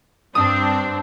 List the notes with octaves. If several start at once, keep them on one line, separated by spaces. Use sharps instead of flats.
G2 C4 D4 D#6